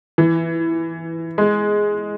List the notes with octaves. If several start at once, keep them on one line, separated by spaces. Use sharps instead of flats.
E3
G#3